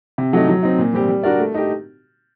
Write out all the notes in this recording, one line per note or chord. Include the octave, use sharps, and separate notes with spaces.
C3
F#3 A3 D#4
F#3
C4 D#4
A#2
G3 C4 G4
G3
D4 F#4 A#4 D5
A3
D#4 G4